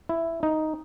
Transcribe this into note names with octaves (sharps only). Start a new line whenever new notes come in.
E4
D#4